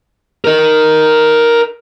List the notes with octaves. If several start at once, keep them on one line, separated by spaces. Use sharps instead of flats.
A#4 D#5